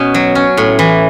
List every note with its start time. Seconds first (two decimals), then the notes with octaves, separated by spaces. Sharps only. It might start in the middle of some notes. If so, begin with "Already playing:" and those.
Already playing: B2 C#4
0.14 F#3
0.35 C#4
0.57 A2
0.79 E3